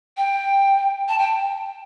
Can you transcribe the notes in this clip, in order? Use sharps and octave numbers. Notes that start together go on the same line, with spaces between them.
G5
A5
G5